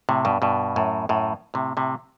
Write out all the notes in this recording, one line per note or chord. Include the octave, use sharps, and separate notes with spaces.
A2 C3
G2 B2
G2 B2
F#2 A2
F#2 A2
A2 C3
A2 C3